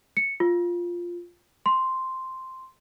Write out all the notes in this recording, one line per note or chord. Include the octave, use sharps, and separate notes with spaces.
C#7
F4
C6